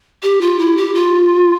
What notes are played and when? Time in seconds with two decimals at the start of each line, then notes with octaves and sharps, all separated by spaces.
0.23 G4
0.41 F4
0.59 E4
0.77 G4
0.94 F4